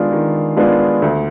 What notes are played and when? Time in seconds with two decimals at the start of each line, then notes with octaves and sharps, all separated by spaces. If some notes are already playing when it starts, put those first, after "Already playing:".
Already playing: D#3 G#3 B3 D4 F4
0.12 D#3
0.57 G#3 B3 D4 F4
1.02 D2